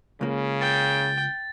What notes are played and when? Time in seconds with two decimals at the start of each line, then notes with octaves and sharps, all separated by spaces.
0.21 C#2 C#3 A#3
0.61 G5 A6